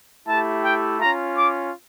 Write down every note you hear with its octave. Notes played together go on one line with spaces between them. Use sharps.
A3 E4 G4 A5
G5
C#4 F4 A#5
D6